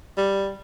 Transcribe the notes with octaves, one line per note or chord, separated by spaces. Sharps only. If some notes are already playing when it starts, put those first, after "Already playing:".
G3